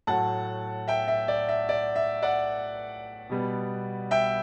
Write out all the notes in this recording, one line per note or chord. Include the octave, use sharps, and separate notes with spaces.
A2 F#3 A3 F#5 A5
E5 G5
E5
D5
E5
D5
E5
D5 F#5
B2 G3 B3
E5 G5